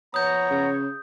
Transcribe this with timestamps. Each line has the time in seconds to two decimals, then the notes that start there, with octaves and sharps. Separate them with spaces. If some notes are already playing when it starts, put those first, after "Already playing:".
0.14 F3 B3 C#5 A#5 D#6 G6
0.50 C#3